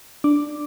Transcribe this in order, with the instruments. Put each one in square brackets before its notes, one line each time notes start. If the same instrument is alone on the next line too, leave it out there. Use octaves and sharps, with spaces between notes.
[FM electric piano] D4 D6